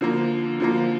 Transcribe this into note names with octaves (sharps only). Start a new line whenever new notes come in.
D3 F3 A#3
D3 F3 A#3